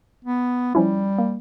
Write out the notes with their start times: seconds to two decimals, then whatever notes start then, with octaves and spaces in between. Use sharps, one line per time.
0.25 B3
0.75 F3 G3 C#4 E4
1.18 A#3